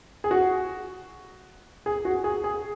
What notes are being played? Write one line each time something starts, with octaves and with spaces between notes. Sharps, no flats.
G#4
F#4
G#4
F#4
G#4
G#4